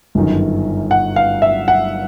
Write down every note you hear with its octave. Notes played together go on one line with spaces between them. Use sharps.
G1 F#2 D#3
F#5
F5
E5
F#5